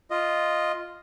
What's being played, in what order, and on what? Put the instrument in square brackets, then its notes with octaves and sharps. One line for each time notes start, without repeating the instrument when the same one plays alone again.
[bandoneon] F4 D#5